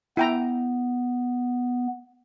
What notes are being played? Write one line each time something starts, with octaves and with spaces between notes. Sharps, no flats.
B3 E4 G5 A#5